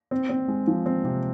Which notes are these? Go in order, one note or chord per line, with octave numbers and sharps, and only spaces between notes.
C4
C4
G#3
F3
C4
C3